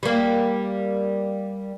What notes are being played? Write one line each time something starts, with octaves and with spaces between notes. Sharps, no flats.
G3 A#3